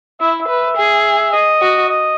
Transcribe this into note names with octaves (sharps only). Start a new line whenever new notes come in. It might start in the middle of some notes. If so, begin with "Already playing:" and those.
E4 E5
E5
B4
G#4
D#5
F#4
D#5